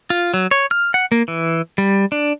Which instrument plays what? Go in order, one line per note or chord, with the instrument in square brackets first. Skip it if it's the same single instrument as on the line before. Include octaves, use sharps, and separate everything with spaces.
[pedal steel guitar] F4
F#3
C#5
F6
F#5
A#3
E3
G3
D4